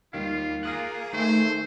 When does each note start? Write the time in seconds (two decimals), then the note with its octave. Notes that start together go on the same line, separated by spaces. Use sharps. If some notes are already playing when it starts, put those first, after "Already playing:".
0.13 D#2 D#3 G3 F4 F5
0.63 A#3 F4 G#4 F5 D#6 F#6
1.13 D#3 A3 C5